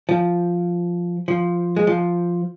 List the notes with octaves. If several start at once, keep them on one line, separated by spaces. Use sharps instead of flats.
F3
F3
G#3
F3